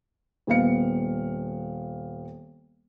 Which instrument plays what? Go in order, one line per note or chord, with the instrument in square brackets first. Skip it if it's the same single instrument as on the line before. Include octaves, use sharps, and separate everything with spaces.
[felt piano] D#1 B3 F5 C#7